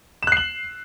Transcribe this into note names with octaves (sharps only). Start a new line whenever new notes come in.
F#6 C7 E7 F#7